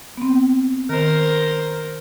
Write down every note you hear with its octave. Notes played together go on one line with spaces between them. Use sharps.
B3 C4
D#3 A#4 C5